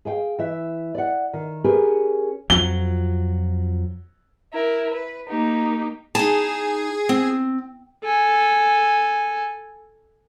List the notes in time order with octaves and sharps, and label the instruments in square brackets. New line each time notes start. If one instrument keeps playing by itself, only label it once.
[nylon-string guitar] G#4 F5 G5
E3 E5
D5 F#5
D#3
C#4 G4 G#4 A#4 B4
[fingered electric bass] F2 F3 F#3 [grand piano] G7
[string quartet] E4 A#4
B4
A#3 D#4 G4
[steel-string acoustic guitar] D#4 A5 [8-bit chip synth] G#4
[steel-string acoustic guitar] C4
[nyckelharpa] A4 G#5